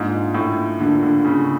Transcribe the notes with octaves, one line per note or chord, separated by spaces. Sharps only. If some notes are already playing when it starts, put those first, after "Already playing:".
Already playing: G#2 A#3 D4 F4
A2
D3 A#3 D4 F4
D3
C#3